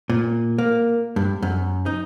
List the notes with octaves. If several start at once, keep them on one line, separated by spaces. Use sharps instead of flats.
A#2
A#3
G2
F#2
D#4